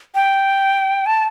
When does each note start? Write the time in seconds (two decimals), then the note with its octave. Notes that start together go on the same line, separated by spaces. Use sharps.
0.15 G5
1.06 A5